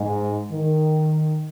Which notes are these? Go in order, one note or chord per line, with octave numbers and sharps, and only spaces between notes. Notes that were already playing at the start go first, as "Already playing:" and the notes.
Already playing: G#2
D#3